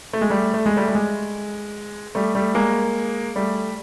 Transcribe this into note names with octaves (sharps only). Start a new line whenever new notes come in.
A3
G#3
G3 A3
A3
G#3
G3 A3
G3
G#3
G3 A3
G3 A3
G#3 A#3
G3 A3